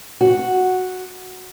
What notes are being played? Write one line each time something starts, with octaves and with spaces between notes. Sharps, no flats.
F#4